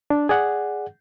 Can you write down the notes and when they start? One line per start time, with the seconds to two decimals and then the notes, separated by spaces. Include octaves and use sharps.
0.10 D4
0.29 G#4 D5 F#5